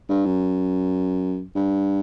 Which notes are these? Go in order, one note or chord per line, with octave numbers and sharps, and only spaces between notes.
G2
F#2
G2